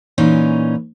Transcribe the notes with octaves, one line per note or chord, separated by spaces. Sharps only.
A#2 E3 C#4 D#4